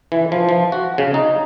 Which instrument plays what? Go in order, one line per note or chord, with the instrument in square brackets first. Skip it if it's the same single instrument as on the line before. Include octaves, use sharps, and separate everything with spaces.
[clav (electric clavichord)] E3
F3
F3
F#4
C#3
D#4